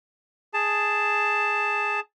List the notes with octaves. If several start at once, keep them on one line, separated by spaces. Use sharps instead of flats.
G#4 A5